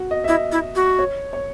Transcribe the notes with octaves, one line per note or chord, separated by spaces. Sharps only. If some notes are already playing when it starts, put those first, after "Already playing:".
Already playing: F#4
D#5
E5
E4 D#5
E4
F#4
C#5
C#5